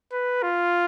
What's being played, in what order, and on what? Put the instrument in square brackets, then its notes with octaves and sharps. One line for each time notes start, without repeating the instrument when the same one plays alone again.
[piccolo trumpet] B4
F4